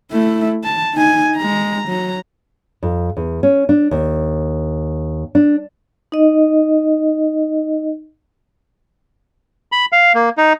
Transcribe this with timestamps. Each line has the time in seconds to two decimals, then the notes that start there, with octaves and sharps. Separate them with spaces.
0.12 A3 E4
0.64 A5
0.94 D#4 G#5
1.37 G#3 A#5
1.89 F#3 A#5
2.83 F2
3.17 E2
3.43 C#4
3.69 D4
3.91 D#2
5.35 D4
6.12 D#4 D#5
9.72 B5
9.92 F5
10.15 A#3
10.38 D#4